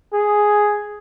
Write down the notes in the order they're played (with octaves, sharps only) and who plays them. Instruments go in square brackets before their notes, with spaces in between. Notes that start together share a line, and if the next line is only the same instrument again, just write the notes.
[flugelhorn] G#4